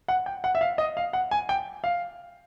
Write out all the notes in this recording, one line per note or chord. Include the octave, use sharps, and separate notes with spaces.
F#5
G5
F#5
E5
F5
D#5
F5
F#5
G#5
G5
F5